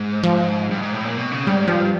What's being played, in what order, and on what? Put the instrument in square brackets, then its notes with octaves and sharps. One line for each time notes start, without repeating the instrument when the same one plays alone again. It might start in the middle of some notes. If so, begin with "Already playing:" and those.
Already playing: [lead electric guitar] G#2
[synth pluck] F3
[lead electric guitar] G2
G#2
A2
A#2
B2
C#3
[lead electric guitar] G#2 [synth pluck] G3
[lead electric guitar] G2 [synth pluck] F3